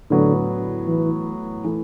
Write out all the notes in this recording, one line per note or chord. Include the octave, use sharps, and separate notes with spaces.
A2 D3 F#3 B3
E3
E3 A3